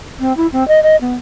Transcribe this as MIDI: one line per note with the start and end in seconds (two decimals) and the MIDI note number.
0.19 0.35 60
0.36 0.46 64
0.52 0.66 60
0.67 0.82 75
0.82 0.95 75
1.00 1.14 59